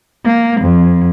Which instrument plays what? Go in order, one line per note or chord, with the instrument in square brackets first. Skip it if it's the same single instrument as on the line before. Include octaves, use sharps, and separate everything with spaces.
[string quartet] A#3
F2